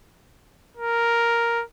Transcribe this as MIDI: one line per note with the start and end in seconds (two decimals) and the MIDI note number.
0.77 1.64 70